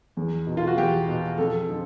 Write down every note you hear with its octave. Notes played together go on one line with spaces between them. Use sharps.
E2
B2
F4
F#4
E2 G4
B2
F2 A4
D3 F3